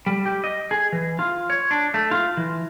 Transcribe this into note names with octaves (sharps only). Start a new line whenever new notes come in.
G3
G4
D#5
G#4
E3
F4
C#5
D4
A3
F4
E3